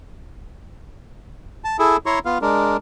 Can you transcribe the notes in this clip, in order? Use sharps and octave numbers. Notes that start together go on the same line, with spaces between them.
A5
E4 G#4 A4
E4 C#5 A#5 C6 C#6
B3 F4 F5
G#3 D4 A#4